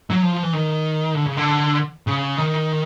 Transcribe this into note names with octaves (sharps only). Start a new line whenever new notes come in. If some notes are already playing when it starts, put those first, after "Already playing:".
F#3
F3
E3
D#3
D3
C#3
D3
C#3
D#3